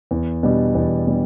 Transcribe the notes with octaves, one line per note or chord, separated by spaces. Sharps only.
E2
B2 G3 D4 G4
E2
B2 G3 D4 G4